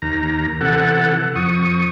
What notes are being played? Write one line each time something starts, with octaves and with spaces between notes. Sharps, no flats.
D#2 A#5
C3 E3 A4 F#5
F2 C#6 D#6